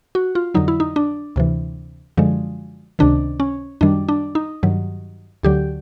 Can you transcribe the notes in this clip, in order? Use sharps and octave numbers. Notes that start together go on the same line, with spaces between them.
F#4
F4
F2 D3 F#3 D#4
E4
D#4
D4
D2 C3 E3
F#2 D3 F3 G#3
C#2 C3 D#3 D4
C#4
F#2 D#3 G3 D4
D4
D#4
G2 D#3 F#3
D2 D3 F#3 G4